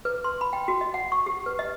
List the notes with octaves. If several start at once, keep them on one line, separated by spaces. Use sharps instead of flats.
B4
C6
B5
G5
F#4
D#5
F#5
C#6
G4
B4
D#5